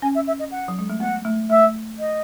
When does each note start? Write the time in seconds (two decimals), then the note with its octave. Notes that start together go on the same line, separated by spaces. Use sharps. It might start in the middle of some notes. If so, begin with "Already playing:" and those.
0.02 C#4 G#5
0.15 E5
0.27 E5
0.39 D#5
0.52 F#5
0.68 F#3
0.79 G#3
0.90 A3
1.00 B3 F#5
1.25 A3
1.50 A3 E5
1.99 D#5